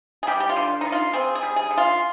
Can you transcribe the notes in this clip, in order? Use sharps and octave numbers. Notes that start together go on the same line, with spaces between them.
G#4
G3 G4
G4
F4
D3
D3 D#4
F4
C4 G#4
G#4
G3
G#4
D3
F4